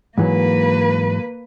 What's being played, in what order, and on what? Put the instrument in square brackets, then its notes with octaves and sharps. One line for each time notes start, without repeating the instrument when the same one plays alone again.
[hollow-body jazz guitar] G#2 E3 F#3 [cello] A#3 B4